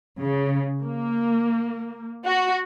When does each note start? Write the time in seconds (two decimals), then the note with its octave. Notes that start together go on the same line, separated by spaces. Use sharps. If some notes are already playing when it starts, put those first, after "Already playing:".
0.19 C#3
0.83 A#3
2.25 F#4